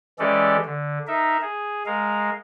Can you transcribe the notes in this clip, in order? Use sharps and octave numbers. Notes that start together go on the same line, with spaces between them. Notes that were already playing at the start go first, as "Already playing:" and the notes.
E3 G#3 C#4 G4 A4 D5
D3
D#4 A#4 E5
G#4
G#3 A#4 F5